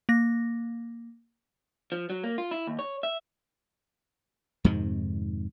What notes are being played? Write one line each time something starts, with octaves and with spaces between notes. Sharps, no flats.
A#3 A#6
F3
F#3
A#3
F4
E4
D#2
C#5
E5
F2 G#2 C3 D#3